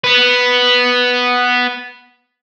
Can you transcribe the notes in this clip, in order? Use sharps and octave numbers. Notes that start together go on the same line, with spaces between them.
B3 B4